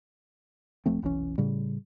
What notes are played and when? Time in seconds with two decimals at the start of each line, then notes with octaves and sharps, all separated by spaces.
0.86 D#1 F3 A3 C4
1.02 F1 B1 E3 C#4
1.38 A2 C#3 G3